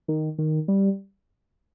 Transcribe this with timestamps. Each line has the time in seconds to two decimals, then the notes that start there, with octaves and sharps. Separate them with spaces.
0.08 D#3
0.38 D#3
0.68 G3